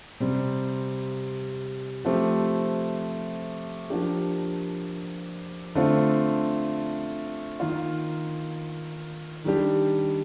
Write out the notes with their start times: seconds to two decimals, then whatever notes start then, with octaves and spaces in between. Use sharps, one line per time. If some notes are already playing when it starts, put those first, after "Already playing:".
0.20 C3 G3 C4
2.05 F3 A3 C4 G4
3.90 F3 A#3 D4 G4
5.75 D3 A3 C4 F4
7.60 D#3 A#3 F4
9.44 D#3 G3 D4 G4